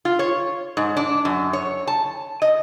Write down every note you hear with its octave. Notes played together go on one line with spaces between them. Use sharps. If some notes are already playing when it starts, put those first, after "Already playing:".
F4
C#5
G#2
D4
F#2
C#5
A5
D#5